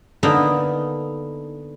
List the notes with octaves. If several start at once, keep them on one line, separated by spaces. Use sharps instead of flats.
D3 A#3 B3 D4 D#4